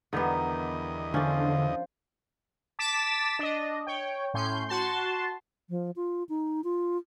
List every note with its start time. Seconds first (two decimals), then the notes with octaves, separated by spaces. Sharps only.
0.13 E2 D3 D#3 G3 B3 D#5
1.14 D3 F3 C#4 D4
2.79 A5 D6 A6 B6 E7
3.39 D4 D#5
3.87 C#5 G5
4.34 A2 C#4 C6 G6
4.69 F#4 A5 C6
5.70 F3
5.96 F4
6.29 D#4
6.64 F4